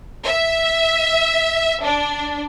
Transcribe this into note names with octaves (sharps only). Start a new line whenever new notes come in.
E5
D4